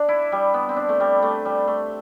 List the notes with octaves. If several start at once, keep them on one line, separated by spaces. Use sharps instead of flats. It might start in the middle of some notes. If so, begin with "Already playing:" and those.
Already playing: D4
E4
G3
B3
C4
D4
A3
G3
A3
G3
A3